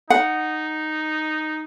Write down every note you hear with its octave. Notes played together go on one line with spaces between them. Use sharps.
D#4 F#5